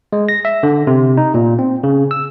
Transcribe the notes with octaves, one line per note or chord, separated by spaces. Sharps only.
G#3
A#6
E5
D3
C3
D#4
A#2
C4
C#3
E6